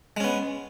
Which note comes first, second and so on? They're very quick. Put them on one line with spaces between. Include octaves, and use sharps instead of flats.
G#3 C#4 B3